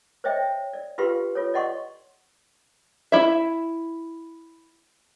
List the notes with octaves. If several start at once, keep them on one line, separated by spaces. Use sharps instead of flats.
C5 C#5 D#5 E5 G5
D5
F4 G4 B4 F5 C6
F4 A4 C#5
D5 D#5 F#5 C6 C#6
E4 E5